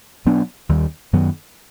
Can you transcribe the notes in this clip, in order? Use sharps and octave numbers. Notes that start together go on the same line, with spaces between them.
B2 F#3 B3 D4
D#2 D#3 G3
F#2 D#3 F#3 B3